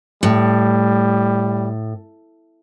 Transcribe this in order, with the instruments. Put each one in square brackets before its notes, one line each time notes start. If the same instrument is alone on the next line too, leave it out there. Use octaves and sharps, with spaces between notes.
[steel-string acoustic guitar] A2 [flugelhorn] G3